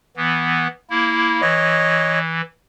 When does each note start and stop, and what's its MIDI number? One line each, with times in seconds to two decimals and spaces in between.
0.17 0.67 52
0.17 0.67 59
0.90 1.41 58
0.90 1.41 64
1.41 2.41 52
1.41 2.19 73
1.41 2.19 75